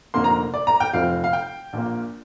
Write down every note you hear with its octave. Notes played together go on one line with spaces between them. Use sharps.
F1 F2 D3 A#3 C6
A#5
D5
A#5
G5
F1 F2 F3 C4 F5
F5
G5
A#1 A#2 A#3